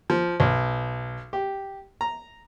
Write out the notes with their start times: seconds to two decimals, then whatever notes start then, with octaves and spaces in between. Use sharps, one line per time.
0.10 F3
0.40 B1
1.33 G4
2.01 A#5